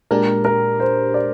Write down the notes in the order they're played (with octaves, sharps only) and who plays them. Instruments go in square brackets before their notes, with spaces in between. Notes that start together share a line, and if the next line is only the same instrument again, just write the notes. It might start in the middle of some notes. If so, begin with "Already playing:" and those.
[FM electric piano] A#2 G#3 D4 G4 [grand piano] A#4
[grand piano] A#4
C5
D5